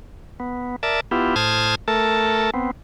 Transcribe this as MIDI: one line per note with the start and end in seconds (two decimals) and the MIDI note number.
0.40 0.76 59
0.83 1.00 70
0.83 1.00 74
0.83 1.00 76
0.83 1.00 81
1.11 1.35 59
1.11 1.35 64
1.11 1.35 65
1.11 1.35 67
1.36 1.75 45
1.36 1.75 72
1.36 1.75 81
1.36 1.75 87
1.36 1.75 89
1.36 1.75 92
1.88 2.50 57
1.88 2.50 69
1.88 2.50 70
1.88 2.50 81
2.54 2.71 59
2.54 2.71 60